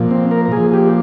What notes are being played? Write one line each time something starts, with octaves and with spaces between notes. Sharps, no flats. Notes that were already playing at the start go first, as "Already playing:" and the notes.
Already playing: A#2 F3
C4
A#4
A#4
A#2 F3 G#4
G4